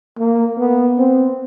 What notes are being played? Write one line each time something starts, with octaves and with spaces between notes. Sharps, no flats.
A#3
B3
C4